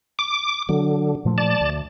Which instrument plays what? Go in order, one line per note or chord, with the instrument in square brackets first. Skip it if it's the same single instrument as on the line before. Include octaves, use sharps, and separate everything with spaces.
[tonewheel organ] D6
[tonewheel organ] D3 [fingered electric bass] F#3
[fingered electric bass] A#2 F3 A3
[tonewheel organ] D5 A5
[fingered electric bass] D2